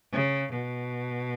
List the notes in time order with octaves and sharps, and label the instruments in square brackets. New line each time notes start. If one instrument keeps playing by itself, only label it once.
[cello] C#3
B2